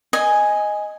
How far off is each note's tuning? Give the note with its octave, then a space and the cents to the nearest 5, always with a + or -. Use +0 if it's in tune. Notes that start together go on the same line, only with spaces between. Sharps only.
D#5 +0 G#5 +0 D#6 +15